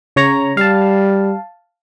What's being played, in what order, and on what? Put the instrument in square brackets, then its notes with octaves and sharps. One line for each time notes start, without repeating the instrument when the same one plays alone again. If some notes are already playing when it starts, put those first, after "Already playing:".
[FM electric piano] C#3 C#5 A#5
[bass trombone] G3 [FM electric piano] F5 A5